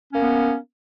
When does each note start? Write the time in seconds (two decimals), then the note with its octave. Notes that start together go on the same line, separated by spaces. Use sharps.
0.10 C#4
0.15 A#3
0.19 B3